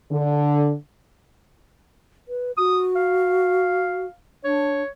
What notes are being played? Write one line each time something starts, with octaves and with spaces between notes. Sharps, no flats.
D3
B4
F#4 D#6
F5
D4 C#5